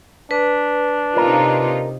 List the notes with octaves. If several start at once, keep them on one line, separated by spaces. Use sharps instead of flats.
D4 B4
C3 D#4 F4 A#4